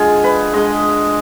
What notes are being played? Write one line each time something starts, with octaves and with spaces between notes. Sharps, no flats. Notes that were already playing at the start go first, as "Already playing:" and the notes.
Already playing: D3 G#3 F4 G#4
B4
D3 G#3 D#5